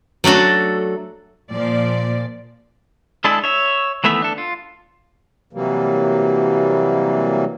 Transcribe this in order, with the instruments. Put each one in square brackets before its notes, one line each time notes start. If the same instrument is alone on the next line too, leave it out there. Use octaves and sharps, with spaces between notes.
[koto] F#3 A3 D4 F#4 A4
[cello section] A#2 F3 D5
[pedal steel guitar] G#3 D4 E4 G#4 A4
C#5 E5
D#3 E3 A3 B3 E5
D4 A4
F4
[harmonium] C3 E3 F#3 G3 A#3